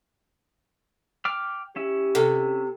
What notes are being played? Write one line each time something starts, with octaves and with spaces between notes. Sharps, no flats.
G5 D6 F6
C#4 E4 G4
C3 A4